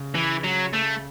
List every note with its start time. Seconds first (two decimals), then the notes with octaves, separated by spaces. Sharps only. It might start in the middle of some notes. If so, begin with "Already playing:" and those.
Already playing: C#3
0.15 E3
0.44 F#3
0.73 A3